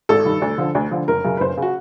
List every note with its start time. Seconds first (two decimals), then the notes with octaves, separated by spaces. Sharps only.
0.09 G#1 A4
0.25 G2 D#3
0.42 D2
0.58 D3 F3
0.75 D2
0.91 D3 F3
1.08 F#1 A#4
1.24 F#2 C#3
1.37 B4
1.40 F#1 C5
1.57 C#3 F#4